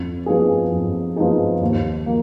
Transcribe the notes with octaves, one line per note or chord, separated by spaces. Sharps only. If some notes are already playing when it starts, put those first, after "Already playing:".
Already playing: F2
F3 B3 D#4 G#4
F2
F3 B3 D#4 G#4
D#2
F3 A#3